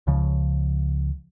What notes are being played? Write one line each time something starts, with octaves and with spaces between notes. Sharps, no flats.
C#2 C#3 F3